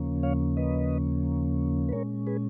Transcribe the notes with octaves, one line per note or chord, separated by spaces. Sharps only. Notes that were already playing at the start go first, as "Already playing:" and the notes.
Already playing: D#2 C#3 F3 A#3 C#4
C#5 F5
B4 D#5
B4
A#2 G#3 C#4 A#4 C#5
G#4 B4